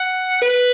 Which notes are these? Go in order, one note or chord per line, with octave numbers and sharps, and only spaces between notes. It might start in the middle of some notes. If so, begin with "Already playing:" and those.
Already playing: F#5
B4